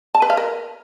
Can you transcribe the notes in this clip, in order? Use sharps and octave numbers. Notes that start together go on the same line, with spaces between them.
A5
B4
F5
A#4